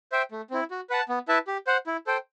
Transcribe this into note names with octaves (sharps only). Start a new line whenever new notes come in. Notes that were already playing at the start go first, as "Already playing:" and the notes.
C5 E5 G5
A3
C4 E4
F#4
B4 F#5 A5
B3
E4 B4 E5 A5
G4
C5 F#5
E4
A4 C5 G5